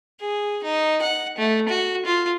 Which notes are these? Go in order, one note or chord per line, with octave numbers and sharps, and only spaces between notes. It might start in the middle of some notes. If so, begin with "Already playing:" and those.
G#4
D#4
F#5
A3
F#4
F4